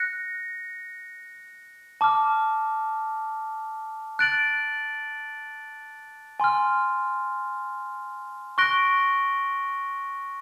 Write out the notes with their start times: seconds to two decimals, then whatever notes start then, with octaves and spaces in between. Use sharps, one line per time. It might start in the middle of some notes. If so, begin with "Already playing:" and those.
Already playing: F#6 A#6 C#7
2.01 A5 D6 F6
4.19 F#6 A6 D7 F#7
6.40 G#5 C6 F6
8.58 C#6 F#6 A#6 D7 G7